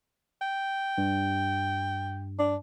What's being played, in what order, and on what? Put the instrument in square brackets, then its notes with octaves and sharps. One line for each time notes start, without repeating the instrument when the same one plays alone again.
[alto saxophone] G5
[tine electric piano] G2
[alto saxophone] D4